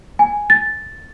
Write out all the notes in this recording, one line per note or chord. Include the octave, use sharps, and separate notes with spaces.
G#5
A6